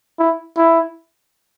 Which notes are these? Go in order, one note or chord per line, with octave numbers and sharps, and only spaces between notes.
E4
E4